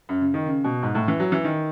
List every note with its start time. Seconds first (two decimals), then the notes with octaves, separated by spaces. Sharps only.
0.09 F#2
0.21 C#3
0.34 D#3
0.46 C#3
0.64 B2
0.83 G#2
0.95 A2
1.08 E3
1.20 F#3
1.32 E3
1.44 D#3